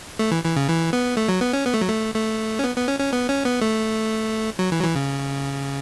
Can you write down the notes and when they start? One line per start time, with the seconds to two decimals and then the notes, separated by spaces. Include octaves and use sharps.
0.19 A3
0.31 E3
0.44 E3
0.56 C#3
0.68 E3
0.93 B3
1.17 A3
1.29 F#3
1.41 B3
1.53 C#4
1.65 B3
1.74 A3
1.81 F#3
1.89 A3
2.15 A3
2.59 C#4
2.64 B3
2.76 B3
2.88 C#4
3.00 C#4
3.13 B3
3.29 C#4
3.45 B3
3.61 A3
4.59 F#3
4.72 E3
4.80 F#3
4.83 E3
4.96 C#3